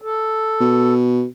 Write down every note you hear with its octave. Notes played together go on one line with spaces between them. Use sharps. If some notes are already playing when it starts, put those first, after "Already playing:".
A4
B2